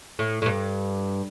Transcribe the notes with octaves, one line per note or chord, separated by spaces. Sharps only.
A2
A2
G2